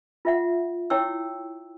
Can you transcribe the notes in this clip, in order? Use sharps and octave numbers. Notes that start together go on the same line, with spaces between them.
F4 E5 F#5
E4 C#5 G5 C#6 E6